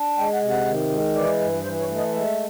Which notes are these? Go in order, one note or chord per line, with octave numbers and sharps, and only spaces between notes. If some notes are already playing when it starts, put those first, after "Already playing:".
Already playing: D4
G#3 G5
F#5
C3
F#5
D#3
G#3
E3 D5
G2
E3 C5
C#5
A3
D#5
G#3 E5